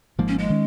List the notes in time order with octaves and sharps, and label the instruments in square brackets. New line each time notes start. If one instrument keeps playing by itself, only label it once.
[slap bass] G#1 G#2 F3 A#3
[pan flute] C#4
G#3
[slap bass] D#3 C#4